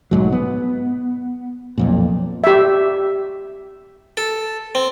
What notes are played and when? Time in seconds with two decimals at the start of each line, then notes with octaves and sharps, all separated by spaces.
0.11 B1 G#2 F#3
0.32 B3
1.78 B1 F2 A#2
2.44 G4 E5
4.17 A4
4.75 C4